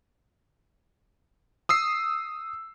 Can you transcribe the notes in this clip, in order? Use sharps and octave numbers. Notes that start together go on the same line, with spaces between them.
D#6 E6 C7